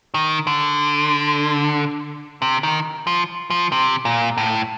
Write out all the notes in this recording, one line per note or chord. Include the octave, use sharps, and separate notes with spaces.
D#3
D3
C3
D#3
F3
F3
C3
A#2
A2